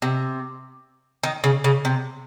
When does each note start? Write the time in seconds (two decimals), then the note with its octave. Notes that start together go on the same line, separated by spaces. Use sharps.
0.02 C3
1.23 D#3
1.44 C#3
1.64 C#3
1.85 C3